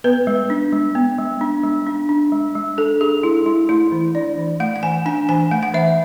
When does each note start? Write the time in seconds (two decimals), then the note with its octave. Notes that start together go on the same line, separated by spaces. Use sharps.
0.04 B3 B4
0.27 G#3
0.50 D4
0.73 G#3
0.95 B3
1.18 G#3
1.41 D4
1.64 G#3
1.87 D4
2.09 D4
2.32 G#3
2.55 G#3
2.78 D4 A4
3.01 D4 G#4
3.23 G#3 E4
3.46 G#3 E4
3.69 A3 E4
3.92 E3
4.15 D4 D5
4.38 E3
4.60 A3 F#5
4.76 F#5
4.83 E3 G#5
5.06 D4 G#5
5.29 E3 G#5
5.51 A3 F#5
5.63 F#5
5.74 E3 E5